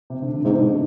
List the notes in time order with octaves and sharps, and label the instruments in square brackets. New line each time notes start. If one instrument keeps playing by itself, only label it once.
[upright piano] C3
D3
D3
[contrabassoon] G#2 [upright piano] C3
[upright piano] B2
D3